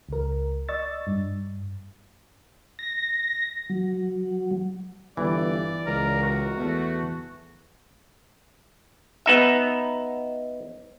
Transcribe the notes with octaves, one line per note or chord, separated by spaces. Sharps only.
C#2 A#4
D5 D#5 C#6 E6 A6
G2
A#6
F#3
G1 E3 D5
C#2 A#4
F#4 A#4
E2 A3
B3 D#4 E5